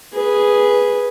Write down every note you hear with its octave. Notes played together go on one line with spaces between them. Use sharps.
G#4 B4